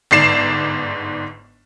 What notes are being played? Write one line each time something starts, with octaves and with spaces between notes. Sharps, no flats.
G1 G#2 D5 C7 E7